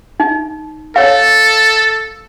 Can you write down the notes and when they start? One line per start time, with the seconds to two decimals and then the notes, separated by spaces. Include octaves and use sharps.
0.20 D#4
0.96 A4 C#5 F5